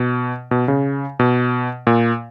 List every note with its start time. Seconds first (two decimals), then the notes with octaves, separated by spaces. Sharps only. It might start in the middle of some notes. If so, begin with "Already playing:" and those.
Already playing: B2
0.51 B2
0.68 C#3
1.19 B2
1.87 A#2